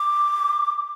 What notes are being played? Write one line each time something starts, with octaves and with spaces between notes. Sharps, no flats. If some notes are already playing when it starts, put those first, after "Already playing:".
Already playing: D6